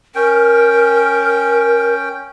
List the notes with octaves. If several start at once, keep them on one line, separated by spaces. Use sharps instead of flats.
C#4 A#4 G5